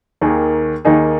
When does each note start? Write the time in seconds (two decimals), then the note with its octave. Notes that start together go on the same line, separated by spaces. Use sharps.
0.21 D#2 D#3 A#3 D#4 G#4
0.85 D#2 D#3 A#3 D#4 G#4